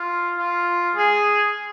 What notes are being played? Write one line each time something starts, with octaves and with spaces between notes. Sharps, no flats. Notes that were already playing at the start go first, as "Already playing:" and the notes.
Already playing: F4
F4
G#4